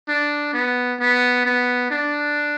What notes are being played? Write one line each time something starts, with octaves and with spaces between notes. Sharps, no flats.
D4
B3
B3
B3
D4